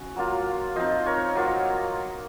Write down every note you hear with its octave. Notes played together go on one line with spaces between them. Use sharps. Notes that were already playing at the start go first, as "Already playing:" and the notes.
Already playing: C#4 F#4
F#3 A#3 F4
F3 C4 D#4 C5 D#5
A#4 C#5
F#3 A#3 F4